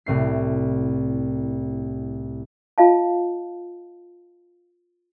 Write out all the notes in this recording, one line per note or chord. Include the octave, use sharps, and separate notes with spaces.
C2 A2 C7
F4 D#5 F5 A5